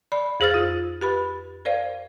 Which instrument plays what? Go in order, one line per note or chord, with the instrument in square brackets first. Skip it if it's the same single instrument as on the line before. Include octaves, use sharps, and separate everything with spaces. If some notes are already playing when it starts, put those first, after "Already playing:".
[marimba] D5 B5
F2 G#4 C5 E6 F6 A6
F4
G4 B4 B5
A#4 C5 D5 F5